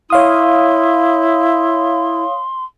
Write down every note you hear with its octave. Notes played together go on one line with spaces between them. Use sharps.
E4 C#5 F5 C6 D#6